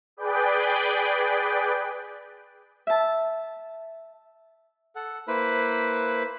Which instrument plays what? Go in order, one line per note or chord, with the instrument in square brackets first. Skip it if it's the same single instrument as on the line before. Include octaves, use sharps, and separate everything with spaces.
[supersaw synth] G#4 B4 D5 G5
[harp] E5 A5
[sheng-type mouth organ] A4 F#5
A#3 E4 B4 C5 B5